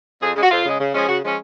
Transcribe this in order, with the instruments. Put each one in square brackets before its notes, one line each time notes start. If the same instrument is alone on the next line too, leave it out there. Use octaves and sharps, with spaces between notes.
[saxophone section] F2 G#4
C#3 G#3
F#4
F2 F4
C#3 G#3
C#3
F3 G#3 C#4 G#4
C#3 F#4
F3 G#3 C#4